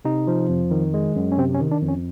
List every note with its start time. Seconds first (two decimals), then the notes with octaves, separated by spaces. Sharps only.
0.05 C3 D#4
0.27 F3
0.49 F2
0.71 D#3
0.94 G#3
1.16 F#2
1.32 C#4
1.38 C3 C4
1.55 C#4
1.60 D#3
1.71 D4
1.82 F2
1.88 C#4